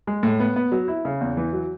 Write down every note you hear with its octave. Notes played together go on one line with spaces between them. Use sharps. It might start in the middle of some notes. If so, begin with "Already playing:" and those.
G#3
A2
B3
B3
F#3
E4
C#3
E2
E3
F#3